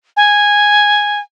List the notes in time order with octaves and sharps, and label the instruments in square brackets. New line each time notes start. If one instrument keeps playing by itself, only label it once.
[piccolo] G#5